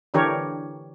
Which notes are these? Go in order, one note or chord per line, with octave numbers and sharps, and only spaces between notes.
D3 E3 D4 G4 A#4 C#5